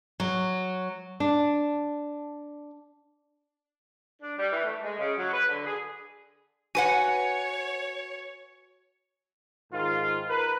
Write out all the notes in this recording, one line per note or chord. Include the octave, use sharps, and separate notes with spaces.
F#3
D4
D4
G3
E3
A3
G#3
C#3
F#3
B4
D3
G#4
F#4 B4 C#5 F#5 G#5
G#2 D#3 F4
A#4 B4